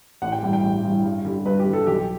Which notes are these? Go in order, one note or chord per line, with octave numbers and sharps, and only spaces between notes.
A1 F#5
G5
G2 E3 G3
G5
A1
G2 E3 G3
G2
D3 G3
G2 B4
G4
D3 G3
A4
B1 G4